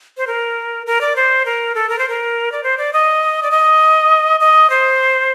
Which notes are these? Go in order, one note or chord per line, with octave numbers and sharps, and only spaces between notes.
C5
A#4
A#4
D5
C5
A#4
A4
A#4
C5
A#4
D5
C5
D5
D#5
D5
D#5
D#5
C5